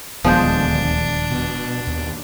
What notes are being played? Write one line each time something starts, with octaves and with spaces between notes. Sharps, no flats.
D#1 D2 F3 G#3 B3 D4 C5
B2
D#2